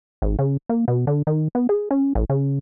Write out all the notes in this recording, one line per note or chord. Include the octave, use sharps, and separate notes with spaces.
G#1
C#3
A#3
B2
D3
D#3
B3
G#4
C#4
A1
C#3